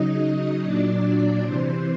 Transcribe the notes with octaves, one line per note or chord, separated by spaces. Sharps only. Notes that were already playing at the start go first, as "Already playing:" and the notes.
Already playing: C#3 F#3 D#4 D#5
A#2 F#3 D4 D5
C3 E3 C5